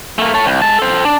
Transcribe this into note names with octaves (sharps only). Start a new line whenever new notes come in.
A3 A#3
A4 C#5
C2
G#3 A5
A4 C5
D4